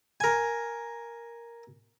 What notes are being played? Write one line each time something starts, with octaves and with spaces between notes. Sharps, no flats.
A#4 G#5